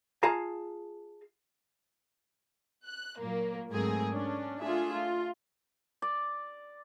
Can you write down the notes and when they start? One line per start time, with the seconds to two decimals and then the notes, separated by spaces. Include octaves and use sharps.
0.23 F4 G#4 F5 A5 A#5
2.86 F#6
3.19 A#2 F#3 A#3
3.71 G#2 F#3 A3 C4 G#4 A#4
4.11 C#4 D4
4.61 A3 D4 F4 G#4 E5
4.93 F4
6.02 D5